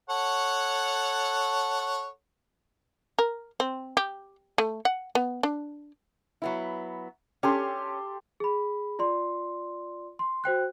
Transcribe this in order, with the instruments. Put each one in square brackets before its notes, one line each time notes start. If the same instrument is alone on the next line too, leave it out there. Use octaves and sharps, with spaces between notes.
[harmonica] A4 C#5 F#5
[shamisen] A#4
C4
G4
A3
F#5
B3
D4
[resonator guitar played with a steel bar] F#3 B3 E4
[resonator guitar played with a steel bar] C#4 [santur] G4 A4 C6
[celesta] G#4 B5
F4 D5 C6
C6
F#4 C5 G5 F#6